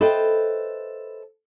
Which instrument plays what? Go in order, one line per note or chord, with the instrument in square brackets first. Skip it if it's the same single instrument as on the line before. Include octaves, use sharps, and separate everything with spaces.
[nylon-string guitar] A4 B4 C5 D#5 E5 G5